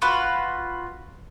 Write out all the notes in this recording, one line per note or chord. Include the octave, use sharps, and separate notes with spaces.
F4 F#4 B4